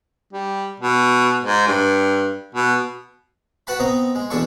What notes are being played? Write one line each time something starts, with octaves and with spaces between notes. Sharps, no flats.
G3
B2
G#2
G2
B2
F#4 B4 F#5 A5 B5
B3 C4 D#5 A#5
G#3
E2 B2 D4 A4 C#6